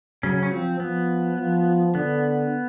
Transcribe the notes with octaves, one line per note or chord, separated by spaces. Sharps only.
C#3 F#3 C#4
C#4
F3 C4
F3 B3
F3
D3 B3